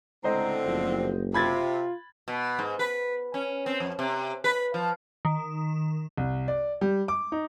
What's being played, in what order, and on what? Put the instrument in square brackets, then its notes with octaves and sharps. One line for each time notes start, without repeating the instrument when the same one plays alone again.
[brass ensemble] C#2 G#3 A#5 [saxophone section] A2 D3 C4 [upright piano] C5 D#5
[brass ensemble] F#1 [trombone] F3
[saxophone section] C3 [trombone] F4 [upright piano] B5 G#6 A6
[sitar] B2
G#2
B4
C#4
C4
F2
C3
B4
F3
[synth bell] D#3
[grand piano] C2
D5
G3
D6
D#4